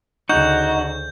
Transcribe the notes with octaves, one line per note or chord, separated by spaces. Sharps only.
D2 C#3 D#4 F#4 G6